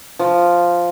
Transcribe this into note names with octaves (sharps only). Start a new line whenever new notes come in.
F3